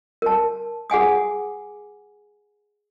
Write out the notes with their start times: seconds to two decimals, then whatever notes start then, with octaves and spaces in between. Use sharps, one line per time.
0.22 A#4 A5
0.90 G#4 F#5 G#5 D#6